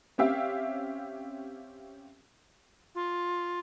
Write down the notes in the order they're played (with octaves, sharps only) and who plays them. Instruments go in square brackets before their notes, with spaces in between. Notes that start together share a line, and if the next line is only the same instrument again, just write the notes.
[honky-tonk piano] C4 C#4 G4 E5 F5
[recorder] F4